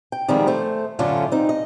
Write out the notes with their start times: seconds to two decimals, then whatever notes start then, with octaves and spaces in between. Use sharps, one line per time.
0.12 G5
0.28 D#3 F3 G3 G#3 B3 C4
0.47 A3 C5
0.99 F#2 A2 D3 A3 C#4 F4
1.32 C4 D#4
1.49 D#5